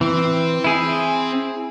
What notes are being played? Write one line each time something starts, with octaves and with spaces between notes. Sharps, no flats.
E3 C4
E4 G#4